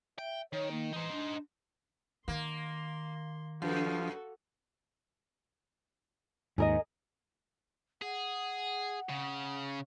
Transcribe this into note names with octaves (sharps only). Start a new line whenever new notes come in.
E5 G5
D#3 C#5
A#3
E3 D#4 C5
D4
D#3 A#3 C6
F#2 F3 F#4 A4
D#2 G#2 G#4 A#4 D#5
G#4 F#5
C#3